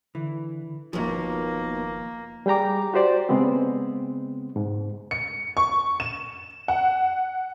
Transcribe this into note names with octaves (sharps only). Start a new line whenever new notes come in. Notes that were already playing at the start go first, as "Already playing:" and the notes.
D3 E3
F#1 D#2 B2 F3 A#3
G3 G#4 G5 A#5 D6
F#4 G4 C5 D5
C#3 G#3 B3 C4
G#2
C#7
C#6
E7
F#5